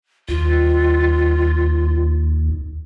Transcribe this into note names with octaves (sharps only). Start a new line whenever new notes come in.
D#2 F4